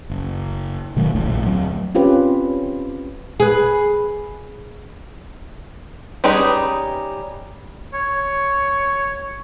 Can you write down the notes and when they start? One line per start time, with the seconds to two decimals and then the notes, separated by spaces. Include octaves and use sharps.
0.10 F#1
0.96 B2 D#3 F#3 A3
1.15 A#1 F2 A2 E3
1.46 D2 F#3 C4
1.95 C4 C#4 F4 G4 B4
3.40 G#4 B4
6.24 G3 C#4 D#4 G#4 B4
7.94 C#5